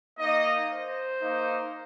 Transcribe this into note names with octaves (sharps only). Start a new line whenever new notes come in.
A#3 D#4 D#5
C5
A#3 D#4